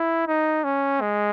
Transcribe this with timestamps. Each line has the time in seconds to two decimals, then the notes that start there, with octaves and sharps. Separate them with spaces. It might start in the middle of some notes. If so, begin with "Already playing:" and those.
Already playing: E4
0.28 D#4
0.64 C#4
1.01 G#3